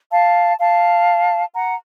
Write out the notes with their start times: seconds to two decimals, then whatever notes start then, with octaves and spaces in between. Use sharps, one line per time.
0.12 F5 A5
0.59 F5 A5
1.54 F#5 A#5